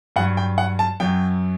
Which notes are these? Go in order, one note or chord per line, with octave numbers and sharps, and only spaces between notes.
G2 F#3 F#5
G5
F#5
A5
F#2 F#3 G5